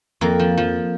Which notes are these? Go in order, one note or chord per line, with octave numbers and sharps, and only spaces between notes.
F2 A#3
F3
F3